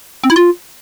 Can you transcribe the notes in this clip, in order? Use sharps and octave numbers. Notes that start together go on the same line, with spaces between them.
C4
E4
F4